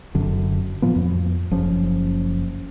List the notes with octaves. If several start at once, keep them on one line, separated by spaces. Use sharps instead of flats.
F#1 F#2 D3
A2 E3 F3 B3
F2
F#1 F3 C#4